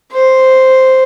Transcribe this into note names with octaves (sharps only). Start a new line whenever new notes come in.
C5